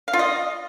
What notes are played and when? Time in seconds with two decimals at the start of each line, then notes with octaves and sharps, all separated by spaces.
0.08 F5
0.13 F4
0.19 D#5